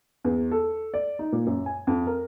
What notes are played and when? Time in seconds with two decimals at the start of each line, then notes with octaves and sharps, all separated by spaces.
0.24 E2
0.51 A4
0.94 D5
1.19 D#4
1.32 A#2
1.46 F#2
1.66 G#5
1.87 F2
2.07 A#4